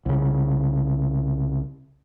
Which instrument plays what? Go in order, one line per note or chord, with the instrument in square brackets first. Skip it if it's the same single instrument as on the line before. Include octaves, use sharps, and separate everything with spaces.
[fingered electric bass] C2 C#3